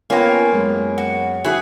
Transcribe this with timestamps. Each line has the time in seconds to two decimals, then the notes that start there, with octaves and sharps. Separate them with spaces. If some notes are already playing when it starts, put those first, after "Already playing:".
0.10 A#3 B3 C#4 F4 G5 G#5 A#5
0.52 F#2 G#3
0.98 F#4
1.44 E4 F#4 G#4 G#5